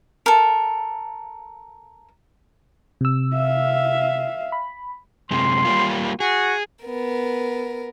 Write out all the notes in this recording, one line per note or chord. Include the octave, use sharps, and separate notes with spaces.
A4 A#4
C3 E6
E5 F5
B5
F#2 C3 G#3 C6
G3 A#3 F4
F#4 G#4
B3 A#4